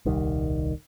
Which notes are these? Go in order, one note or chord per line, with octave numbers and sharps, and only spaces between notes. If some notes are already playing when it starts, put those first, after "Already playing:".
D#1 C2 D#3 G3